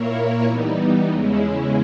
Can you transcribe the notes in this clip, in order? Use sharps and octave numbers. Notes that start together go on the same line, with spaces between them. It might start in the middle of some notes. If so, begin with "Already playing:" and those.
Already playing: A#2 A#3 E4 A#4 C#5
E3 G3 B3 D#4
E2 C#3 G#3 C#4 E4